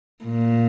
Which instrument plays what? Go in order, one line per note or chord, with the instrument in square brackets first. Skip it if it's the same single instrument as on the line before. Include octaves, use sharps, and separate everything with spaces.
[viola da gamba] A#2